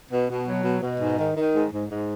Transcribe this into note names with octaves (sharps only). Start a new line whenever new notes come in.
B2
B2
F#3
B2
B2
G#2
D#3
D#3
G#2
G#2
G#2